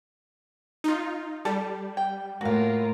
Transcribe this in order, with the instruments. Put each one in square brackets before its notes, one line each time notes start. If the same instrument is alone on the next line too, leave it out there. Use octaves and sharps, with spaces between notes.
[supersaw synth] D#4 F4
[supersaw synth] G3 [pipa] A4
[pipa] G5
[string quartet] A2 A#3 F4 [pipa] F#4 F5